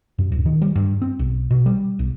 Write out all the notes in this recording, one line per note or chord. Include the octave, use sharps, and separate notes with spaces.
F#2
D1
D#3
G3
G2
C4
B1
B2
G3
B1